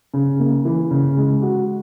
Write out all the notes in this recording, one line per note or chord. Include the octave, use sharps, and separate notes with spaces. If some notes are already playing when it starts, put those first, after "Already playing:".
C#3
A#3
E3
C#3
G#3
F#4